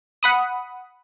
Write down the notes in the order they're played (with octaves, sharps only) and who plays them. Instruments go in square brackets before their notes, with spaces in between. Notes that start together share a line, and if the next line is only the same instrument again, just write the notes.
[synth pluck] F#5 B5 D#6